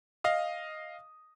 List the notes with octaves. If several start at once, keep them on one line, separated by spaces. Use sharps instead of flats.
D#5 F5 D#6